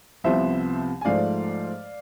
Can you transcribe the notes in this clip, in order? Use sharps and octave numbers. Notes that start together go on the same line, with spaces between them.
C2 C3 F3 B3 C5 E5
G#5
G#2 F3 A3 D5 F5